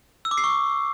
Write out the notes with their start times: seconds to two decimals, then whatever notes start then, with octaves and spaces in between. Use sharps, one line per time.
0.25 E6
0.31 D6
0.38 C7
0.44 C#6